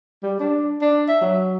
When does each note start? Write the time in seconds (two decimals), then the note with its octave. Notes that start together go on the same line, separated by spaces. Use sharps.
0.23 G3
0.39 D4
0.81 D4
1.08 E5
1.21 F#3